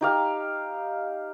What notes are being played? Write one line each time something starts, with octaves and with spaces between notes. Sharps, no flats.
D#4 G4 F5